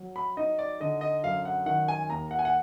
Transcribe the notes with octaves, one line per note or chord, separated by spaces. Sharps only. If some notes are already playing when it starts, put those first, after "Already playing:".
Already playing: F#3
B5
D#4 D#5
D5
D3 D#5
D#5
F#2 F5
F#5
D#3 F#5
G#5
D#2 A#5
F#5
G#5
F#5